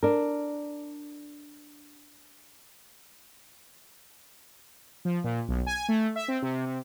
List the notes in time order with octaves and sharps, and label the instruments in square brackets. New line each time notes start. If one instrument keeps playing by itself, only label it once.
[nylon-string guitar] D4 A#4
[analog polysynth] F3
A#2
B1
G#5
A3
E5
C4
C3
C3